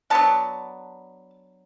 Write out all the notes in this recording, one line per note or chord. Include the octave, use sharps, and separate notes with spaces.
F#3 B3 D4 A5